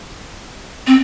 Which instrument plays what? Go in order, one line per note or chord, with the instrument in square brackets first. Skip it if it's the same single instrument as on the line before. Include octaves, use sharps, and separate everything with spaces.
[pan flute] C4